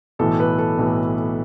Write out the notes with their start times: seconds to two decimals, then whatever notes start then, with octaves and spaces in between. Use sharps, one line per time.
0.19 B1 A2 E3 A4
0.40 B4
0.59 A4
0.78 B1 A2 E3